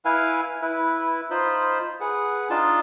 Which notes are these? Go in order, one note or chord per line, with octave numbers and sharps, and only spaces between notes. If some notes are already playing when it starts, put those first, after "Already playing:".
E4 B4 F5 G#5
E4 B4
D#4 F4 C5 B5
G#4 B4 F#5
D4 D#4 F4 A5